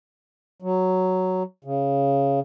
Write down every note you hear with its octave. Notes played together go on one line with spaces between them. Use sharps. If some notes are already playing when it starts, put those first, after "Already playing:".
F#3
C#3